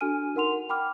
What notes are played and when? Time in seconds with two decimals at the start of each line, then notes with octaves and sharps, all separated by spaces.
0.01 D4 F#4 A4 G#5 F6 D#7
0.35 D#4 A#4 F#5 C6 F7
0.51 F#5
0.69 G5 B5 D6 F6